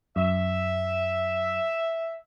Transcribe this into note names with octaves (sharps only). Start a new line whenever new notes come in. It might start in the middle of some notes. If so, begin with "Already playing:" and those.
F#2 E5